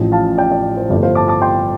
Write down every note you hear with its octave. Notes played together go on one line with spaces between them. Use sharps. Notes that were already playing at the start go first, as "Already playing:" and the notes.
Already playing: A1 A2 F3
F5 A5
D5 G5
D5
C5
G1 G2 F3 A3 D5
C5 F5
A5 D6
A5 D6
G5 C6